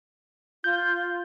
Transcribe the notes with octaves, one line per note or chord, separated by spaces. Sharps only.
F4 G6